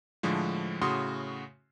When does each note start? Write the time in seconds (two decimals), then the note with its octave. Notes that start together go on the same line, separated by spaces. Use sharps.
0.23 A2 D3 F3 G#3
0.82 A2 C#3 F#4 C6 D#6